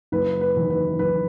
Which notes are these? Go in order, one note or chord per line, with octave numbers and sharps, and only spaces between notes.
F#1 B4
B4
E2 D#3
B4
F#1 B4